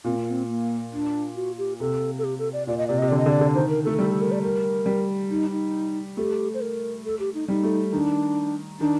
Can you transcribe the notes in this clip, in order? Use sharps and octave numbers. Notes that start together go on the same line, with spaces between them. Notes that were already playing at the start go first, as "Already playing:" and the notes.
A#2 C4
A#3
C4
A#3
D4
F#4
G4
C3 A4
A4
G4
A4
D5
A#2 D5
D#5
C3 D5
C3 D#5
D3 D5
D#5
D3 D5
D3
D#3 C5
A#4
A3 A4
G3 A4
A4
A#4
D5
A#4
G3
D#4
D#4
A3 G4
C5
A#4
A4
G4
D#4
G3 D#4
A3
D#3 D4
D#3 D4